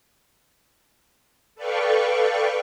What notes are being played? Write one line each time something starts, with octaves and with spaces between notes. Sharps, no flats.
A4 B4 D5 F5 G5 C#6